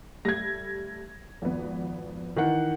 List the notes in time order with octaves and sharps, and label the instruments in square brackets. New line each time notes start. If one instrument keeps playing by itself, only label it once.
[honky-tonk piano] G3 A3 [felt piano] G#6 A#6
[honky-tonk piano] G#1 F2 B3
[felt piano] D#3 E3 F#5